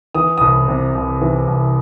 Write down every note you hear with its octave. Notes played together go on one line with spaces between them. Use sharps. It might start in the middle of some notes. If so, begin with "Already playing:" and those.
E3 D#6
C2 D#6
C3
C2
E3
C2